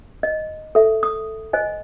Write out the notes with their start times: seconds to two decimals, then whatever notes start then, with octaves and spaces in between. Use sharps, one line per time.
0.23 D#5
0.75 A4 E5
1.03 D#6
1.53 C5 D#5 G#5